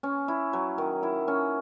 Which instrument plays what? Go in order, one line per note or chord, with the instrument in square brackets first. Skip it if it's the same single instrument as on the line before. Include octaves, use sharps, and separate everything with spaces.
[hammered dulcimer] C#4
E4
F#3
D#3
E4
C#4